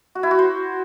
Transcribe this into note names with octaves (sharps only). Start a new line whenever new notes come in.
F#4
E4
F#4
C5